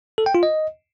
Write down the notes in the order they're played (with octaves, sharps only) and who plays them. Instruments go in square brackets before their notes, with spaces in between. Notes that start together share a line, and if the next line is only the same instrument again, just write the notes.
[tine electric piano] A4
G5
F4
D#5